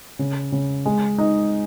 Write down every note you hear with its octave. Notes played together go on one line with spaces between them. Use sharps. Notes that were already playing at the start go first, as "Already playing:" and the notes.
C#3
C#3
G#3
D#4